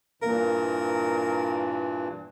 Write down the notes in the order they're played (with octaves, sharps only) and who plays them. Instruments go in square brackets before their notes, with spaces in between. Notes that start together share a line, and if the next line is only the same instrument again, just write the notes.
[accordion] G2 A#2 E3 [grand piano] A#3 [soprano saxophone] A#4